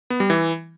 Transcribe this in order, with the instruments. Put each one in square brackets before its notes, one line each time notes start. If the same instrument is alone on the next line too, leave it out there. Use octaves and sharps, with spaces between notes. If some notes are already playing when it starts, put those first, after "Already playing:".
[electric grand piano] B3
G3
E3